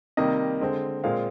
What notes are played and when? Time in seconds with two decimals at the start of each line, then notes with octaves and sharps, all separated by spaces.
0.17 C3 D#3 G3 A#3 D#5
0.61 D3 G#3 C4
1.03 A#2 G#3 C4 F5